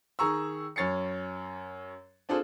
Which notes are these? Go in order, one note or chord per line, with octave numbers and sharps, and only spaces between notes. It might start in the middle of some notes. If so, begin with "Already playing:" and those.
D#3 G#4 A#5 C#6 E6
F#2 C#5 A6 C7 C#7
C4 D4 F4 G#4 A4 C5